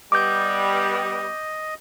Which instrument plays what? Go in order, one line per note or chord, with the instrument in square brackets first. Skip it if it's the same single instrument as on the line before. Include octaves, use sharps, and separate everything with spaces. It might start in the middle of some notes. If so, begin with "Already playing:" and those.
[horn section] G3 B3 [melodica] D#5 [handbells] D6 G6